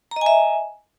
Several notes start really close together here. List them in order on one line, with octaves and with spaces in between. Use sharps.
A#5 D#5 G#5 E5